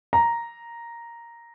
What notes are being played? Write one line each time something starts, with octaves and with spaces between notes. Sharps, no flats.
A#5